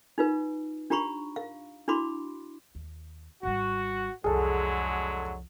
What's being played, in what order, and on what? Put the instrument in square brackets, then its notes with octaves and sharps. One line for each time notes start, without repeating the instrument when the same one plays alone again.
[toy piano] D#4 F4 B4
D4 F4 G4 A#5 B5 C#6
F5
D4 E4 F#4 B5 C6 D6
[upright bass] D#2
[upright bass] G#1 G3 [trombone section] F#4
[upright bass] C2 F2 [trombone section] D3 F#3 G#3 [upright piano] G#4 A4